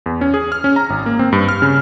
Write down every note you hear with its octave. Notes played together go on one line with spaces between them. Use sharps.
E2
C#4
G#4
F6
C#4
A#5
G#1
A#3
C4
G2
F6
C#3